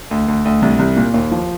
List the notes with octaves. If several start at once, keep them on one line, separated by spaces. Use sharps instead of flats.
D2
D2
D2
C2
C2
A#2
D#2
F3